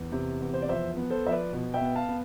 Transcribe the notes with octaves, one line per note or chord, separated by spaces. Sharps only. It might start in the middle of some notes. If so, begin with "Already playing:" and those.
Already playing: E2
C3
E2
C5
D5
F3 C5 E5
B3
A4 C5
F3 E5
B4 D5
B2
E5 G5
B3
F5 A5
B3